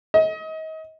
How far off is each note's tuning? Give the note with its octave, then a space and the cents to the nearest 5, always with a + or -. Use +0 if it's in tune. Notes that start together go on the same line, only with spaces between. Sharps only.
D#5 +30